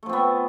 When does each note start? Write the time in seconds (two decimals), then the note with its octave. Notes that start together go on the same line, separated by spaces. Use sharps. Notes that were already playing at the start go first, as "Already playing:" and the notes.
0.03 A3
0.06 F3
0.09 C4
0.13 B3